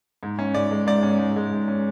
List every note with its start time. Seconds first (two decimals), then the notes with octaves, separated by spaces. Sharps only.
0.23 G#2
0.39 C#4
0.54 G#2 D5
0.71 G#3
0.87 G#2 D5
1.03 C#4
1.19 G#2
1.36 G#3
1.52 G#2
1.68 C#4